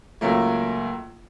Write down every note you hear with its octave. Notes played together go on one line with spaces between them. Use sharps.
C#2 F#3 A3 A#3